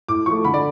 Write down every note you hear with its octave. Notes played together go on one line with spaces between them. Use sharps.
A2 D6
F3 A3 C#6
D3 B5
D5